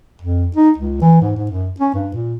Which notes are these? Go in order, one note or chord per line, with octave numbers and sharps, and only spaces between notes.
F2
D#4
C#2
E3
G#2
G#2
F#2
C#4
G2
A#2